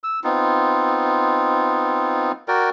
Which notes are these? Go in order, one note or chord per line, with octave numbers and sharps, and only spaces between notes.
E6
B3 C4 D#4 F4
F#4 A#4 D5 G5